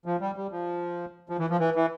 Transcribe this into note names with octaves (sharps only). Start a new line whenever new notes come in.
F3
G3
G3
F3
F3
E3
F3
E3
E3